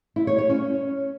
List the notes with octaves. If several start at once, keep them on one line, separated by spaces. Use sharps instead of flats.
E4
C#5
C#5
C#4